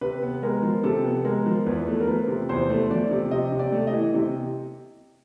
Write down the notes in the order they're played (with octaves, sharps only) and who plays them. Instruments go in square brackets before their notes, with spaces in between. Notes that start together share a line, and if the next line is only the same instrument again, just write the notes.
[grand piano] C3 B4
B3
G#3 A#4
F3
C3 A4
B3
G#3 A#4
F3
E2 B4
A3
A#4
F3 B4
C3
E2 C5
A3
F3 D5
C3
C3 D#5
C3
D5
A3
D#5
E3
C3